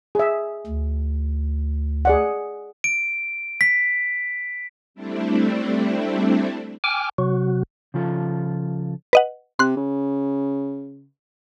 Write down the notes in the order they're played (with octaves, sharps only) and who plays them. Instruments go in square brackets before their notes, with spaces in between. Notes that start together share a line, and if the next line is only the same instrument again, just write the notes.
[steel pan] G#4 E5
[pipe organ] D2
[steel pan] G#4 D5 F#5
[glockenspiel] D7
B6
[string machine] G3 A3 C4 D4 E4
[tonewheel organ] G5 G#5 D6 F6
C3 F#3 F#4
[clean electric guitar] C#3 F3 F4 A4
[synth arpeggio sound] B4 D#5 F#5
[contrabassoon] C3 [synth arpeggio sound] C6 F#6
[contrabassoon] C#3